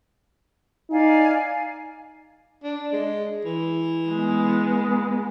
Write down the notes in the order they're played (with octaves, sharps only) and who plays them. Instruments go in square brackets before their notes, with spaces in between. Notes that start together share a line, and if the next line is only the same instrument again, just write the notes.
[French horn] D#4 [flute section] D5 F5 G#5
[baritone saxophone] D4
G#3
E3
[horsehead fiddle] G#3 B3